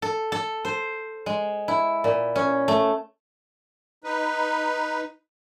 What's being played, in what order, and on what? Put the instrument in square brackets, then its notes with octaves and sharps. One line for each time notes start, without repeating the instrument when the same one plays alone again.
[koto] A4
A4
C5
G#3
E4
A#2
C#4
A3
[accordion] D#4 B4